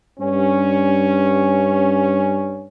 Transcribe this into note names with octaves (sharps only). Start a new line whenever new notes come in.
G2 C#4